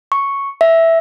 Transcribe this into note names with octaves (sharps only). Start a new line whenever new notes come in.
C#6
E5